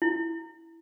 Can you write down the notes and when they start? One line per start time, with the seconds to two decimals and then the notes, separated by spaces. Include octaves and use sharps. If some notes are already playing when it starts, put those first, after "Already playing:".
0.02 E4